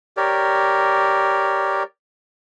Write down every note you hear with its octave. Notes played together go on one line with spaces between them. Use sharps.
G4 A#4 C#5 D5